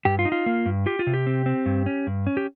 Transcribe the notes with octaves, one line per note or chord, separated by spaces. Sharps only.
G2 G4
F4
D#4
F4
A#3
G2
F4 G4
F4
C3
G4
C4
C4
G2
C#4
G2
C#4
G4